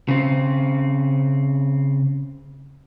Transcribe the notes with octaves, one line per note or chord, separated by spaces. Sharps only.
C#3 C4